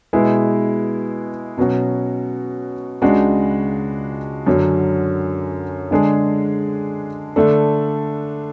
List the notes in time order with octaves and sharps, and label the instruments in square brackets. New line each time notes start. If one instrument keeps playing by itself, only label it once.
[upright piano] B2 G#3 B3 E4 G#4
B2 F#3 C#4 F#4
C#2 C#3 G#3 D4 F#4
F#2 D3 F#3 C#4
D3 G#3 D4 G#4
D3 A3 D4 A4